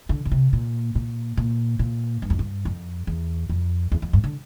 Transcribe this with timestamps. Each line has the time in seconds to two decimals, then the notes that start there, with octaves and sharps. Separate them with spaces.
0.09 D3
0.25 D3
0.32 C3
0.53 A#2
0.95 A#2
1.37 A#2
1.79 A#2
2.22 G2
2.30 F2
2.39 G2
2.65 F2
3.07 E2
3.49 F2
3.92 E2
4.02 F2
4.13 G2
4.24 D3